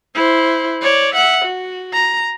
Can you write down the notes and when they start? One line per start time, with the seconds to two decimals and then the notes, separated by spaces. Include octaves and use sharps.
0.14 E4 C5
0.82 C#5 D5
1.15 E5 F#5
1.45 F#4
1.93 A#5